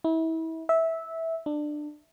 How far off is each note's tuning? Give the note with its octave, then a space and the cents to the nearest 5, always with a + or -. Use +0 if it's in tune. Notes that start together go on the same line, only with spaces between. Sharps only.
E4 -30
E5 -15
D4 +20